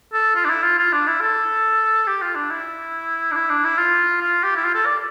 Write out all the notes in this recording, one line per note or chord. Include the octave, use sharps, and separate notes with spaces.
A4
F4
D4
E4
F4
F4
D4
E4
A4
G4
F4
D4
E4
D4
E4
D4
E4
F4
F4
G4
E4
F4
A4
D5